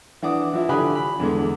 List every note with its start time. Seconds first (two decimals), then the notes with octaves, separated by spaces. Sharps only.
0.22 E3 D4 F#5 D6 D#6
0.54 E3 F3 E4
0.69 D3 G4 G#5 B5 D#6 F#6
0.95 B5
1.20 E2 D3 G#3